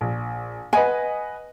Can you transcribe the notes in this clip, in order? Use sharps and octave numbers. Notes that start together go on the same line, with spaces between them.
A#1
B4 D#5 F#5 G#5